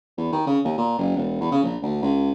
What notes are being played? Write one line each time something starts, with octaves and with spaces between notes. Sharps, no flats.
E2
D#3
C#3
D#2
A#2
F#1
E1
E2
C#3
A#1
D2
C#2